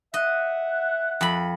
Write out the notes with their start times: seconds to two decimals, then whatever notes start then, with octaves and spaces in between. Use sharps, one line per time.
0.14 D#5 E5 F#5
1.21 F2 B5